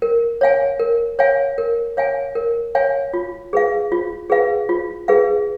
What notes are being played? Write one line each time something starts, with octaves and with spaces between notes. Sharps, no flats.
A#4
C#5 F5 G#5
A#4
C#5 F5 G#5
A#4
C#5 F5 G#5
A#4
C#5 F5 G#5
F4
G#4 B4 F5
F4
G#4 B4 F5
F4
G#4 B4 F5